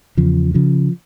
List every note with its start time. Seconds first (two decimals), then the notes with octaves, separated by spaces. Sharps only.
0.17 E2 C#3 F3
0.54 C#3 F3